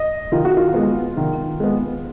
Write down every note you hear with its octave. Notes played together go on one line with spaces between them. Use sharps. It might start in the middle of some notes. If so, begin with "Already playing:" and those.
Already playing: D#5
D#3 F4
F#4
F4
G#3 B3
D#3
G#3 B3